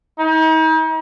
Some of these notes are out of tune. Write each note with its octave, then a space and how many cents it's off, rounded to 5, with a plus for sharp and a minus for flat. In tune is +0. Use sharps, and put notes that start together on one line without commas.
D#4 +40